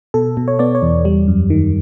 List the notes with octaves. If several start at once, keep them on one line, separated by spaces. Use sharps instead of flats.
B2 A4
B2
C#5
B3 D5
C#5
E2
G3
F#2
D#3